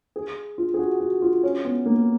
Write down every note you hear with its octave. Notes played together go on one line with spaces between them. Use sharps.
G#4
F4
G#4
F#4
F#4
F4
C#4
B3
A#3